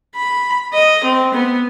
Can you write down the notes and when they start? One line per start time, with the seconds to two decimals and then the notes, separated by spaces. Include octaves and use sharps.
0.16 B5
0.74 D#5
1.04 C4
1.34 B3